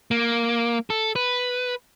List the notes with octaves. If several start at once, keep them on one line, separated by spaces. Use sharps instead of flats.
A#3
A4
B4